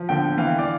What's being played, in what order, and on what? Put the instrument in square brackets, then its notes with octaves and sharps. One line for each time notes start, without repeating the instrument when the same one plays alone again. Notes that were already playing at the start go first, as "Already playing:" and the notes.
Already playing: [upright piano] F3
D3 G5
E3 F5
D5